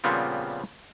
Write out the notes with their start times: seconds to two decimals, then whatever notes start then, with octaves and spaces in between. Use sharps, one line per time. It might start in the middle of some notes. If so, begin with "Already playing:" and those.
0.04 A#2 C#3 F3 G3 B3 C4